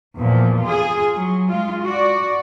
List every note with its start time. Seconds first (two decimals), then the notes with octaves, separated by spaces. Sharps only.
0.16 E2 A#2 F3
0.62 F4 G#4
1.14 F#3
1.49 G#3 F4
1.83 F#4 D5